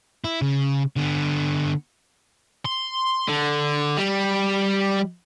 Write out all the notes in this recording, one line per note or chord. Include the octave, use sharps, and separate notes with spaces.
E4
C#3
D3 B3
C6
D3
G3